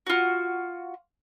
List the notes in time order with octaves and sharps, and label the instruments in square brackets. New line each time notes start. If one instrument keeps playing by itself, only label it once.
[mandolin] F4 F#4